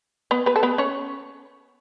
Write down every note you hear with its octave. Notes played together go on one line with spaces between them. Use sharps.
B3 B4
B3 B4
A4
B3 B4
C#4 C#5